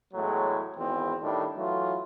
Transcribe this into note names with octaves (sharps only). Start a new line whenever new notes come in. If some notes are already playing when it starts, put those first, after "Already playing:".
E2 A2 F#3 G#3
G#1 E2 B2 C4
A2 D#3 G3 D4
E3 F#3 A3 F4